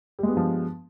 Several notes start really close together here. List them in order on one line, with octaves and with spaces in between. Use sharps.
G3 G#3 B3 G2 F3